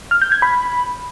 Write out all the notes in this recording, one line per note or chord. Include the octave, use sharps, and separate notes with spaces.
F6
G6
G#6
B5